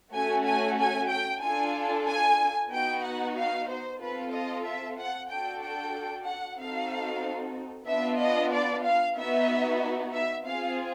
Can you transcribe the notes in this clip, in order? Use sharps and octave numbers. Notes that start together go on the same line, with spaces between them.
A3 C#4 F#4 G#5
G#5
G#5
G5
D4 F4 A4 G#5
G#5
B3 D#4 F#4 G5
F#5
F5
C5
C4 F4 A4 B4
D#5
E5
F#5
D4 F#4 A4 G5
G5
F#5
C4 D#4 F#4 A4 F5
B3 D4 F4 E5
D#5
D5
F5
B3 D#4 F#4 E5
E5
C4 F4 G#4 F5